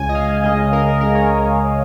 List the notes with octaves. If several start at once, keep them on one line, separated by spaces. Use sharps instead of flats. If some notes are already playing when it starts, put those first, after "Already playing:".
Already playing: C#2 C#3 G#3 G#5
D#5
F5
C#2 C#3 G#3 D#5
A#4
C#2 C#3 G#3 A#4
C#5